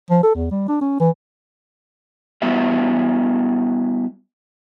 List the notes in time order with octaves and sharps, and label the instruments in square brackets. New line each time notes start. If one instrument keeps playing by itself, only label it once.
[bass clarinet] F3
A4
E2
G3
D4
C#4
E3
[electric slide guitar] G3 B3 E4 F#4 G4 E5